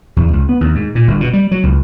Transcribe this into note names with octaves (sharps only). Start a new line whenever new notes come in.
E2
C#2
B3
D#2
G#2
A#2
G1
B2
G3
F#3
C#2